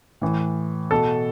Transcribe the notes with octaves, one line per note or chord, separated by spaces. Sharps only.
A2 E3
B2 A4